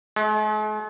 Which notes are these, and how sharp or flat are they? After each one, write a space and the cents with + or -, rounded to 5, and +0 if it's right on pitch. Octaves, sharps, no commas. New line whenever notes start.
G#3 +45